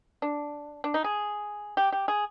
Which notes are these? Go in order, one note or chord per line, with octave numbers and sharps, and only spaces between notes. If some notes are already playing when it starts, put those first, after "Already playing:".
D4
D4
D#4
G#4
G4
G4
G#4